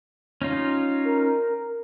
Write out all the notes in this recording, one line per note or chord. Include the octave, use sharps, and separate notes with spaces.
C#4 D#4 F4
A#4